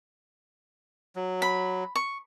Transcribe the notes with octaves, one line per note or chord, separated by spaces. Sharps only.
F#3
B5
C#6